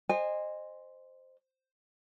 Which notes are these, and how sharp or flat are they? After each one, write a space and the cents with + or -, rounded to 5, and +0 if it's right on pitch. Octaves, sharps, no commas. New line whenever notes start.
C5 +0 D#5 -20 G#5 -25